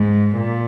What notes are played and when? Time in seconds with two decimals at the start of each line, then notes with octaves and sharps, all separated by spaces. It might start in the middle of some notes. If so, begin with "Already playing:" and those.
Already playing: G#2
0.37 A#2